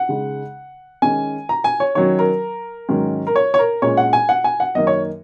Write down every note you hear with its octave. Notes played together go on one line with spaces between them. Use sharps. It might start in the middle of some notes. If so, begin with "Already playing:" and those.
Already playing: F#5
C#3 G#3 D#4
D#3 G#3 C#4 G#5
A#5
G#5
C#5
D#3 F#3 C#4 C#5
A#4
G#2 D#3 F#3 C#4
A#4
C#5
C#5
A#4
A#2 G#3 C#4 C#5
F#5
G#5
F#5
G#5
F#5
F#2 D#3 A#3 D#4 D#5
C#5